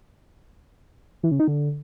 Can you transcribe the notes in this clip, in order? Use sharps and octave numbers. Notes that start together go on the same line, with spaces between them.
E3
C#3
D#4
D3